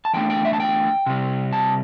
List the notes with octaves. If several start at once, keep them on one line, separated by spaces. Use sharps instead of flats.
A5
E2 D3 A3 G5
G5
E5
A5
G5
C3 G3
A5